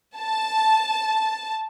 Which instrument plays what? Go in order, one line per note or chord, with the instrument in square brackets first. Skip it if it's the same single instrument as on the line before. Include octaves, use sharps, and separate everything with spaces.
[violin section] A5